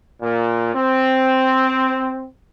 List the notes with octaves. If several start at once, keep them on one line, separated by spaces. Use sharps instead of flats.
A#2
C4